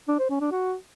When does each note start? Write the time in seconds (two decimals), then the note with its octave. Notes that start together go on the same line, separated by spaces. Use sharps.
0.08 D4
0.19 C5
0.30 C#4
0.41 D4
0.51 F#4